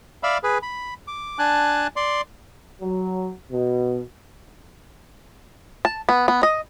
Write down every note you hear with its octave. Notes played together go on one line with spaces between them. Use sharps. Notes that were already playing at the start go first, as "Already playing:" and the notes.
D5 E5 F5 B5
G#4 B4
B5
D6
D4 G#5 A5 F#6
D5 C6
F#3
B2
A5
B3
B3
D#5